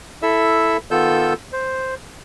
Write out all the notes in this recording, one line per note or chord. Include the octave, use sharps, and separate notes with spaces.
E4 A4 E5 E6
D#3 B3 F4 A4 E6 G6
C5